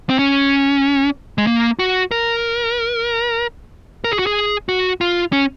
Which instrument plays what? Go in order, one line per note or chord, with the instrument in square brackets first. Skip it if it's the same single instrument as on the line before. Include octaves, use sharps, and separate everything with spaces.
[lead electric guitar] C4
C#4
G#3
A#3
F#4
A#4
A#4
G#4
F#4
G#4
F#4
F4
C#4